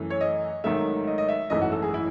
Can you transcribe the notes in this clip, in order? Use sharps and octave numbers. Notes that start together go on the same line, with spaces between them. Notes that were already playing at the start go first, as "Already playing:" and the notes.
Already playing: F#2 E3 A3
C#5
D#5
G#1 G#2 D#3 F#3 A3 E5
D#5
D#5
E5
G#1 F#2 E3 A3 D#5
F#4
A4
G#4
E4